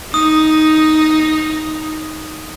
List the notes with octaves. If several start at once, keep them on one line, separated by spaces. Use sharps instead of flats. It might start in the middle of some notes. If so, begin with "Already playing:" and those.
D#4 D#6